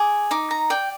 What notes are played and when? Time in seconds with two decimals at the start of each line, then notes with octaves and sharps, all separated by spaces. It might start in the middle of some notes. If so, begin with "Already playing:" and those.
Already playing: G#4 D6
0.31 D#4 D6
0.51 A#5
0.70 D5 G5